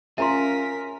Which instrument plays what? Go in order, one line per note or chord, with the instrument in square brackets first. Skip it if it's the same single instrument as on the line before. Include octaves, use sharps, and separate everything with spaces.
[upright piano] C#4 F4 [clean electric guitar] G#4 [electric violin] A#4 B6 [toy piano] E5 A#5 C6